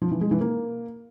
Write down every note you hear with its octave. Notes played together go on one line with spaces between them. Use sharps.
F3
E3
G#3
E3
A#3